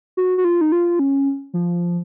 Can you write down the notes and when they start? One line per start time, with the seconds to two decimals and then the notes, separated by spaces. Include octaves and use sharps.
0.17 F#4
0.38 F#4
0.45 F4
0.61 D#4
0.72 F4
0.99 C#4
1.54 F3